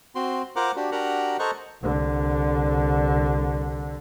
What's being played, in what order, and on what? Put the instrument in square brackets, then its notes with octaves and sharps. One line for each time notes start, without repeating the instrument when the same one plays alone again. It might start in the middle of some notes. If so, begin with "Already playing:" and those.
[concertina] C4 F#4 C6
F4 A#4 C5 F#5 A#5 D6
D4 F#4 G4
D4 F#4 G4 A#4 F#5 A#5
A4 C5 D#5 A#5 C#6 F#6
[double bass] C2 D3